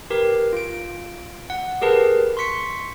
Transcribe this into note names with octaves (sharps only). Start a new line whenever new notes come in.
G4 A#4 B4
F4 D7
F#5
G4 G#4 A#4 B4 A5
C6 C#6 B6 C#7